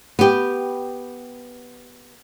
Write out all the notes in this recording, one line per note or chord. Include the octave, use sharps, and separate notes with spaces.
B3 G4